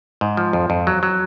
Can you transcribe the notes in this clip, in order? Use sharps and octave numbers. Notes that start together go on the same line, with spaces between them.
G#2
F3
F2
F2
F#3
F#3